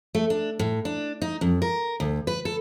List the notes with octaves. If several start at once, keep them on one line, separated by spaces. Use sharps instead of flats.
A3
D4
A2
D4
D#4
F2
A#4
D2
B4
A4